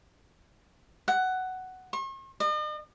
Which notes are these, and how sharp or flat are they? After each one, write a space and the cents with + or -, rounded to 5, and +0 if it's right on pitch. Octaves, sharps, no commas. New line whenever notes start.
F#5 +10
C#6 -45
D#5 -45